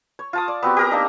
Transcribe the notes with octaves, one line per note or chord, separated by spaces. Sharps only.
C#5
F4 A5 D#6
D5
B3 C4 F#4 G4
G4 A#4 A#5
A#3 D4 D#4